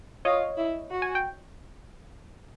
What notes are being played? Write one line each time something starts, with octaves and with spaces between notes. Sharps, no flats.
F4 C#5 D#5
E4
F#4
G#5
G5